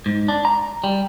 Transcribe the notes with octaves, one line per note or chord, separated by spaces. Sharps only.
G#2
D4
A#5
G3